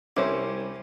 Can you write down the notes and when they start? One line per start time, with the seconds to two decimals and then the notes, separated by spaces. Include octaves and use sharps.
0.17 C2 C#4 C5 C#5 E5 C6 D6